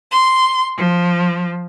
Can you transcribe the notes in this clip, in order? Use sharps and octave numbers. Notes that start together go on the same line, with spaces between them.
C6
F3